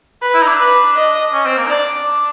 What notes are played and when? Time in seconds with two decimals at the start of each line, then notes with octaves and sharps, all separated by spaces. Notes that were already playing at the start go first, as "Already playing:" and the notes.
0.22 B4
0.34 E4
0.42 D#4
0.46 D4
0.59 B4
0.96 D#5
1.33 C#4
1.46 C4
1.57 A#3
1.66 D#4
1.70 D4 D5